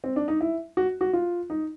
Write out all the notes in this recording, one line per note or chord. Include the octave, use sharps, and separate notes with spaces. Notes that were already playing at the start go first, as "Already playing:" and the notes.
C4
D4
D#4
E4
F#4
F#4
F4
D#4